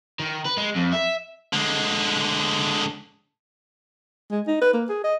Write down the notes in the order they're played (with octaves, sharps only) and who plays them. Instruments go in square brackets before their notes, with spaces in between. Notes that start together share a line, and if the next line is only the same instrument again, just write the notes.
[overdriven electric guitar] D#3
B4
G#3
F2
E5
[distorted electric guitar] D3 G#3
[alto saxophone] G#3
D#4
B4
A#3
G#4
D#5